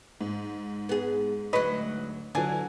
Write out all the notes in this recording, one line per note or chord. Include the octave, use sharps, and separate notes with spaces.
G#2
B3 G#4
D2 F#3 B4 C#5 D#5
D3 E3 F#3 D4 G#5